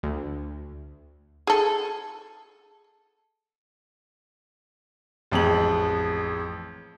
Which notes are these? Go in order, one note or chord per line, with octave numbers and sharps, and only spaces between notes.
D2
G#4 A4
A1 F2 G#3 F#7